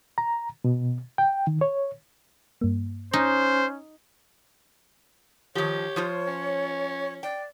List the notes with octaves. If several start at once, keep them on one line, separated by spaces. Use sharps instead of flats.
A#5
B2
G5
D#3
C#5
G2 A#3
C#4 D#4 C5
D#3 F3 G4 C#5
F3 F4 C5
C#4
D5 G5